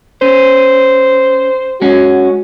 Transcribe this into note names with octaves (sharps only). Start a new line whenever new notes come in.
C#4 C5
G#3 C#4 F#4